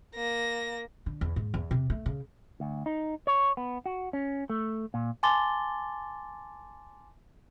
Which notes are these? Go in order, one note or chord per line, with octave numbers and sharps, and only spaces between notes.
A#3 A#6
D3
E2
G#2
E2
C3
A3
C#3
D2
D#4
C#5
B3
F#4
C#4
A3
A#2
G#5 A5 C6 D6 A6 G7